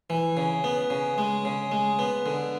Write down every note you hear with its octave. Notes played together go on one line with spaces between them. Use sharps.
E3
C#3
B3
C#3
G#3
C#3
G#3
B3
D3